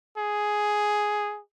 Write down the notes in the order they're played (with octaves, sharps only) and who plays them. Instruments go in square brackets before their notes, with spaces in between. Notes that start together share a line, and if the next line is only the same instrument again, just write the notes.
[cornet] G#4